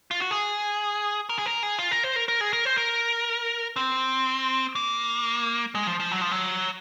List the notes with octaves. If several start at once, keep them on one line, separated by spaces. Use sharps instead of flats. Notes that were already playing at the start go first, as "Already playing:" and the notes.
F4
F#4
G#4
A#4
G#4
A#4
G#4
F4
A#4
C5
A#4
A#4
G#4
A#4
C5
A#4
C4
A#3
G#3
F3
F3
F#3
F3
F#3